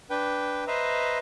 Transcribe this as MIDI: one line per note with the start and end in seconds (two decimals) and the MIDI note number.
0.10 0.64 62
0.10 0.64 71
0.10 0.64 79
0.67 1.18 71
0.67 1.18 72
0.67 1.18 75
0.67 1.18 76
0.67 1.18 82